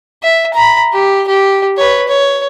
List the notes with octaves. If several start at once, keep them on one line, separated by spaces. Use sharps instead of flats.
E5
A#5 B5
G4
G4
B4 C#5
C#5